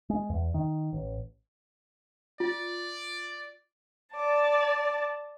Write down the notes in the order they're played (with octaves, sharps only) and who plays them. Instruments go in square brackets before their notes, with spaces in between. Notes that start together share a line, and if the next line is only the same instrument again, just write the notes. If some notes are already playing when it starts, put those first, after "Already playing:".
[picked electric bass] G#3
E2
D#3
A1
[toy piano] F4 [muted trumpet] D5
[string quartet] D5 A5